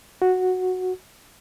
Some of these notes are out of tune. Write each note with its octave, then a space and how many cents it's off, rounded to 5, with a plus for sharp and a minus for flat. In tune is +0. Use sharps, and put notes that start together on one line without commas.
F#4 -5